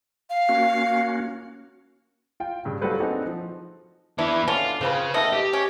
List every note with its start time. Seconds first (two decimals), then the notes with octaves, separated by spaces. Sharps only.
0.30 F5
0.49 A#3 C#4 F#4
2.40 F4 G5
2.65 G2 C#3
2.81 F#3 G3 F4 A4 B4 C5
2.99 C4 D4 D#4 F#4 G#4 A4
3.26 F3
4.18 E3 B3 D4 E4
4.48 D3 C#4 D4 F4
4.81 C#3 F3 C4 B4
5.14 B2 D#3 A3 D#5
5.33 G4
5.53 C#4